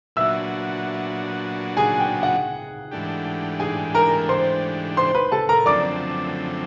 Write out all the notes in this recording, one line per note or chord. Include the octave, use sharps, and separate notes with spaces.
A#2 F#3 B3 D4 F#4 E5 E6
G#4 G#5
G5
F#5
G#2 E3 A3 D4 G4
G#4 G#5
A#4 A#5
C5 C6
C5 C6
B4 B5
A4 A5
A#4 A#5
F#2 D3 F3 A3 C4 D5 D6